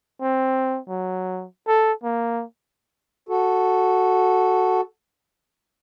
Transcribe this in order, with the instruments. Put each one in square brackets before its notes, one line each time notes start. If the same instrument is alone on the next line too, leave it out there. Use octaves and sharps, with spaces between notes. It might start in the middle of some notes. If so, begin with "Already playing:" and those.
[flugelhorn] C4
F#3
A4
A#3
[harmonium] F#4 A4